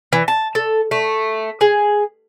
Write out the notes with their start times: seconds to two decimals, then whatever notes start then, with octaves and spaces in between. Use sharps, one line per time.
0.13 E3
0.28 A5
0.55 A4
0.91 A3
1.61 G#4